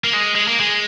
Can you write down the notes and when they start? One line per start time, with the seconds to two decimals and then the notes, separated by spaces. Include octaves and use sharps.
0.04 A#3
0.13 G#3
0.35 G#3
0.48 A#3
0.60 G#3